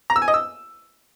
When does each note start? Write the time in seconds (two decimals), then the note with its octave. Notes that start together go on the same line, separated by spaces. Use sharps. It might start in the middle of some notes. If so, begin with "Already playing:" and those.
0.10 A#5
0.16 E6
0.22 G#5
0.28 D#5
0.34 E6